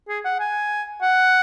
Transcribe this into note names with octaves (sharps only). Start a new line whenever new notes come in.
G#4
F#5
G#5
F#5